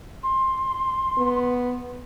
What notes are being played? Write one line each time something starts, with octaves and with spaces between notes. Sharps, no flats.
C6
B3